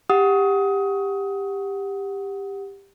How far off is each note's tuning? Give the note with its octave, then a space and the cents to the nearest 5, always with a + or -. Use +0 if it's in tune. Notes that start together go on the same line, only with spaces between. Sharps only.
G4 +15 F#5 +0 D#6 +20